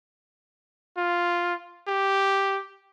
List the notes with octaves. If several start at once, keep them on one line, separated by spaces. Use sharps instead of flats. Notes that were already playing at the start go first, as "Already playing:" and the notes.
F4
G4